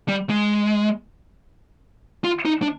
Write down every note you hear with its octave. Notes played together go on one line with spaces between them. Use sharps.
G3
G#3
F4
D#4
D4